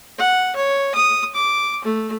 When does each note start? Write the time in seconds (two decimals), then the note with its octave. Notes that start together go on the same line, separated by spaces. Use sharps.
0.19 F#5
0.56 C#5
0.95 D#6
1.35 D6
1.85 A3